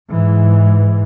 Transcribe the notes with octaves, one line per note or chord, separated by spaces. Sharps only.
G#2 E3